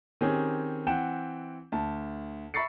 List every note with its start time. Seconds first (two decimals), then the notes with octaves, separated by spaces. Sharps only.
0.21 D#3 C4 C#4 G4 G#4
0.86 E3 C4 F#5 G5 E7
1.72 D2 A5
2.54 E5 B5 C#6 A6 C7 C#7